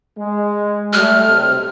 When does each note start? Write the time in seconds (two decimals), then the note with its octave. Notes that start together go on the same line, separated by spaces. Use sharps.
0.18 G#3
0.93 G3 A3 F6
1.28 B1 C3